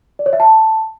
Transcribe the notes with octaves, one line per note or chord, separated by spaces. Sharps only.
D5
C#5
E5
A5